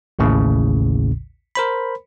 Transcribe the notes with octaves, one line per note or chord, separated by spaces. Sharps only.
A1 D#2 A2 C#3
A#4 C5 B5